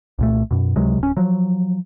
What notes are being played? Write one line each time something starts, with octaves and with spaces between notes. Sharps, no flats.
C2 A#2 A3
F#2 B2
C#2 C3 F#3 G#3
D1 C#4
F3 F#3